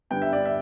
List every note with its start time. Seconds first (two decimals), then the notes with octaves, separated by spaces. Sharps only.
0.10 G2 D3 G3 B3 G5
0.22 E5
0.33 D5
0.46 E5